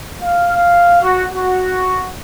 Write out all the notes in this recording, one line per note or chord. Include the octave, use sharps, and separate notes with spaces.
F5
F#4
F#4